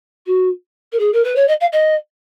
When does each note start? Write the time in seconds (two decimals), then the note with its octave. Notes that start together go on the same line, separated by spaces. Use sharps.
0.26 F#4
0.92 A#4
0.99 G#4
1.13 A#4
1.24 B4
1.35 C#5
1.48 D#5
1.60 F5
1.72 D#5